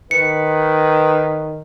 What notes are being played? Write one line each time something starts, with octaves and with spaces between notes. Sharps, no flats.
D#3 B4 C#7